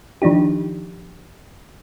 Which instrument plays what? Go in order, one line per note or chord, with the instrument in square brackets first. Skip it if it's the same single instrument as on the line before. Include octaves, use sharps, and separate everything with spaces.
[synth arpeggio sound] D#3 F3 D4 D#4 G4